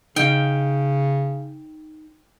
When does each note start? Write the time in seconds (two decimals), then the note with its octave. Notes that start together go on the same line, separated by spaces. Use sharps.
0.16 C#3 D#4 F5 G5